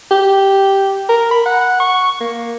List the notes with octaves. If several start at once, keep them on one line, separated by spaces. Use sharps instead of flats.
G4
A#4
B5
F#5
C#6
A#3